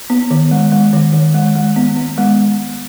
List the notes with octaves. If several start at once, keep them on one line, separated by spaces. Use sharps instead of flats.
B3
D#3
G#3
G#3
D#3
D#3
G#3
G#3
B3
B3
G#3